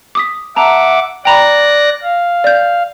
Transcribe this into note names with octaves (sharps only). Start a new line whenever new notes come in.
D6 D#6 B6
E5 F#5 A5 A#5 D6
D5 G5 A#5 B5 F#6 A#6
F5
D5 G6